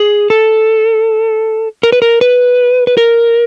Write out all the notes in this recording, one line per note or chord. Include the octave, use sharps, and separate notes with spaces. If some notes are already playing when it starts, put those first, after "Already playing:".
Already playing: G#4
A4
A#4
B4
A#4
B4
B4
A#4